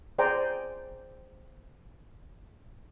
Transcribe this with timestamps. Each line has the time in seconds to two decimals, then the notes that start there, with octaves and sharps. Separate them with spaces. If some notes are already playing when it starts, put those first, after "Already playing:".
0.18 G#4 C5 D5 G5 G#5 A#5